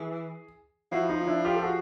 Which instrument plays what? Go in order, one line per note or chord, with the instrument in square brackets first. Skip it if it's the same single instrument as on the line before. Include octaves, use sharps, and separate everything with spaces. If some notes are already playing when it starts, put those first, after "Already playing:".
Already playing: [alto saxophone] E3 [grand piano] G#4
[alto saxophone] F3 [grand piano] E4 F#4
[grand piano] D#4 F4
D#4
D4 E4
F4 G4
A4
F#4 G#4